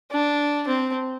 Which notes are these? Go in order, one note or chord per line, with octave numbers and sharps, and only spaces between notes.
D4
C4